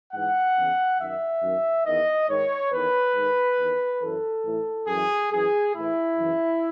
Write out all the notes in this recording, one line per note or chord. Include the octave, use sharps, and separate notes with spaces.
G#2 E3 F#5
E2 C#3 E3
F#2 D#3 E5
F#2 D#3
E2 D#3 D#5
G#2 D#3 C#5
E2 D#3 B4
G#2 D#3
E2 D#3
F#2 E3 A4
A2 E3
F#2 E3 G#4
F#2 E3 G#4
A2 E3 E4
F#2 C#3 E3